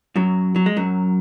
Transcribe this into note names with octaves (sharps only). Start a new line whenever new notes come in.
F#2 F#3
F#3
G#3
F#2 F#3